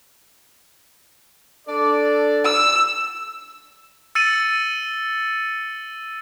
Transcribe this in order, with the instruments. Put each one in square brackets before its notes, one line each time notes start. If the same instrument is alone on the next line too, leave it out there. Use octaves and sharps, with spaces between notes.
[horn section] D4 A4 D5
[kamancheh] E6
[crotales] E6 A6 C#7 D#7 F#7